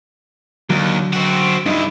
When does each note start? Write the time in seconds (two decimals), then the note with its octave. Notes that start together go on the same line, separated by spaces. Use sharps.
0.70 D#2 D3 F#3
1.14 C4 F#4
1.66 G2 D#4 E4